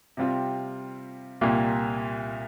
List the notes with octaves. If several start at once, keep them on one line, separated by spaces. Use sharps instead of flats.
C3 G3 C4 F4
C2 A#2 G3 A#3 F4